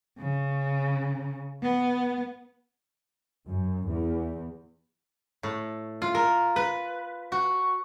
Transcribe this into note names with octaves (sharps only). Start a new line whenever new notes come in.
C#3
B3
F#2
E2
A2
F4
A#4
B4
F#4